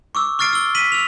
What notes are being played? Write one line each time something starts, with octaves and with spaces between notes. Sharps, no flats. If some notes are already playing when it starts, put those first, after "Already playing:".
C#6 D6 E6
C#6 F6 A6 C7 D7
E6 G7
B6 D#7 F#7
E6 F7